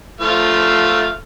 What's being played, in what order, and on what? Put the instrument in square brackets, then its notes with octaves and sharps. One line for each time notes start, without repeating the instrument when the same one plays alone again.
[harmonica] F3 A3 F5